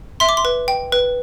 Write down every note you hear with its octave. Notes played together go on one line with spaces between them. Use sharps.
E5 C6
D6
C6
B4
G5
B4